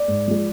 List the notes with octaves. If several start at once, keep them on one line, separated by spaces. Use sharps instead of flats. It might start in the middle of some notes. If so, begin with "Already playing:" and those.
Already playing: D5
G#2
F3 G#3